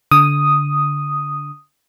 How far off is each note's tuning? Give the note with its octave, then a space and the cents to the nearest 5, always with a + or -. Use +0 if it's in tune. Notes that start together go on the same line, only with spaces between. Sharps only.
D3 -20 D#6 +0